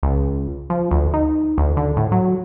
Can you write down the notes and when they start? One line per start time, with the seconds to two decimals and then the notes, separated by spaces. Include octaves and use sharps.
0.03 C#2
0.70 F3
0.91 D2
1.14 D#4
1.58 D2
1.77 D3
1.97 A2
2.12 F#3